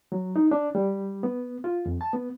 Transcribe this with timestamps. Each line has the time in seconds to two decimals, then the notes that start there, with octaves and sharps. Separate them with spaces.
0.12 F#3
0.36 D#4
0.51 D4
0.75 G3
1.23 B3
1.64 F4
1.86 F2
2.01 A5
2.13 B3